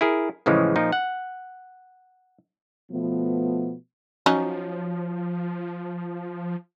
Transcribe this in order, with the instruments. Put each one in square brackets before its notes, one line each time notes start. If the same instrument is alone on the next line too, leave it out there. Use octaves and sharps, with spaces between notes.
[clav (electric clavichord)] E4 G#4 A#4
A2 C#3 E3 F3 G#3
A#2 F3 D#4
F#5
[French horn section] B2 F3 A3 B3
[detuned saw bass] F3 [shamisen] F#3 C#4 D#4